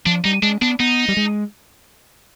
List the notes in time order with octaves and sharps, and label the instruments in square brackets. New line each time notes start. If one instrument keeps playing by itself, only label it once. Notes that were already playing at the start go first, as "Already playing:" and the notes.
[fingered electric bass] F3 [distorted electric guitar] D4
[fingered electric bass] G3 [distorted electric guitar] D#4
[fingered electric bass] G#3 [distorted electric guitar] D4
[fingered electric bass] B3 [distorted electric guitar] D4
[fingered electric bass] B3 [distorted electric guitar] D#4
[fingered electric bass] G3
G#3